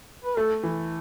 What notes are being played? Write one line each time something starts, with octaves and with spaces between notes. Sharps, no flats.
B4
A3 A4
E3